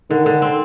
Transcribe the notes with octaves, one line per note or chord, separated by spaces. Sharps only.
D3 D#3
D3
C4